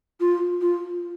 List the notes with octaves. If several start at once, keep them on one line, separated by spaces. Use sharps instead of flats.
F4
F4